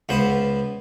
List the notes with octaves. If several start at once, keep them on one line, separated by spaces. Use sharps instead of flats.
C#2 B3 C5